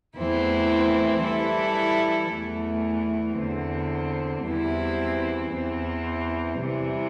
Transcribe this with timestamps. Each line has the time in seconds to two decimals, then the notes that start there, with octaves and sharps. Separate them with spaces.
0.16 E2 E3 A3 C4 E4
1.23 E3 G3 E4 A4
2.31 E2 E3 A3
3.37 E2 D3 C4
4.45 E2 E3 G3 C4 E4
5.53 E2 E3 C4
6.60 C3 E3 G3